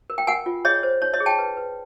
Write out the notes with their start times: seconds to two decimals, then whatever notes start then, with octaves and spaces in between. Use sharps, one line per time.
0.10 A#4
0.18 G5
0.27 A#4 F#5 G#5
0.46 F4
0.65 G#4 C#5 D#5
0.83 C5
1.02 D#4 C#5
1.13 C#5 D#5
1.20 G#4
1.26 G5 A5
1.39 B4
1.57 B4